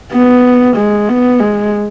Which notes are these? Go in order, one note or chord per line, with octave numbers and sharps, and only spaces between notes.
B3
G#3
B3
G#3